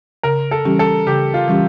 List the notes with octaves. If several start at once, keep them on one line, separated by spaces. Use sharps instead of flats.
C#3 A#4
A4
E3 G3 C#4 G4
A4
C#3 G4
F4
E3 G3 C#4 G4